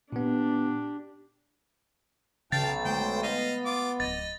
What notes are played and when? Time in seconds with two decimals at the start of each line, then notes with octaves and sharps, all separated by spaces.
0.12 A#2 B3 D4 G4
2.52 B1 C#3 F5 G5 A5 A6
2.85 D3 G#3 A3 C5 G5
3.23 B3 D#5 F5
3.66 F4 D6
4.00 D1 D#5 A6